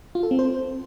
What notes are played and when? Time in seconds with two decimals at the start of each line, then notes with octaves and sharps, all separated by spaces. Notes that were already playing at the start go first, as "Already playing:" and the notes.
0.15 F4
0.23 A4
0.31 C4
0.39 C5